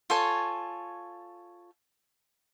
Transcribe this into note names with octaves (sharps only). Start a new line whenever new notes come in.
F4 A4 C#5 G#5